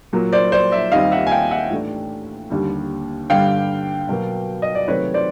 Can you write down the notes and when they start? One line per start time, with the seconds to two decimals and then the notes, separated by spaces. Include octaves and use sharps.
0.13 A#2 F#3 A#3
0.33 C5 D5
0.52 C5 D5
0.72 D5 E5
0.92 D#2 D#3 G3 C4 D#5 F5
1.11 E5 F#5
1.27 G#5
1.31 F5 G5
1.51 E5 F#5
1.71 A2 E3 A3 D4
2.50 D#2 D3 G3
3.30 G2 D3 G3 F5 G5
4.09 B2 F#3 A#3
4.62 D#5
4.75 D5
4.88 C3 D#3 F#3 A3 C4 B4 C#5
5.14 C5 D5